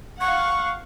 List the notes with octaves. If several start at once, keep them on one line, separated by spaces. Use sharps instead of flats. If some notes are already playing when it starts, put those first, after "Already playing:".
F5 F#5 C#6